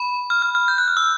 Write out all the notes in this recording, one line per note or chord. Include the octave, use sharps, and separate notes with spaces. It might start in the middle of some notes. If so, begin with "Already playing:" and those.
Already playing: B5
F6
F6
F6
G6
F#6
F6
E6